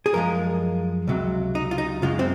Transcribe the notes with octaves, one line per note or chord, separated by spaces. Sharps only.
G#4
F#2 F3 G#3 A#4
C#2 C3 F#3
D#4
F4
D#4
F#2 C#3 G#3 F4
C4